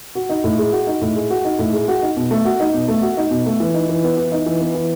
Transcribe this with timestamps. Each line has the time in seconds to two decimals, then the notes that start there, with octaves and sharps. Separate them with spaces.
0.15 F#4
0.29 D#4
0.44 A2
0.59 G#3
0.72 F#4
0.87 D#4
1.02 A2
1.16 G#3
1.30 F#4
1.45 D#4
1.59 A2
1.73 G#3
1.88 F#4
2.02 D#4
2.17 B2
2.31 A3
2.45 F#4
2.60 D#4
2.74 B2
2.88 A3
3.02 F#4
3.17 D#4
3.31 B2
3.46 A3
3.60 E3
3.74 D#4
3.89 E3
4.04 B3
4.17 E3
4.32 D#4
4.46 E3
4.61 B3
4.75 E3